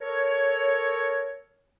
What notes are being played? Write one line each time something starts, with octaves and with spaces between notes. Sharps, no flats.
A4 A#4 C#5